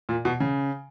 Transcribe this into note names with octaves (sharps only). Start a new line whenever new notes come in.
A#2
B2
C#3